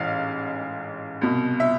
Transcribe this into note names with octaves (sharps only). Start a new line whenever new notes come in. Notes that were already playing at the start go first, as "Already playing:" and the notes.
Already playing: A1 G#2 E3 F5
C2 B2
E5